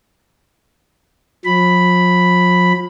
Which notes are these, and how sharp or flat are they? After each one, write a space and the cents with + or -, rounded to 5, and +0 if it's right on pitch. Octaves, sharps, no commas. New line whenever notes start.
F3 +40 B5 +0